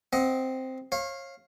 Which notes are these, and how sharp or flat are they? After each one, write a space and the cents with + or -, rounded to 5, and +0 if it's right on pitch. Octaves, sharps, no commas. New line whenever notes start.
C4 +0 D#5 +15 F#5 +0
C#5 -35 F5 +0